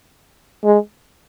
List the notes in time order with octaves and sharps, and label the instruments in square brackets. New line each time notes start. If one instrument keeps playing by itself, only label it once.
[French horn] G#3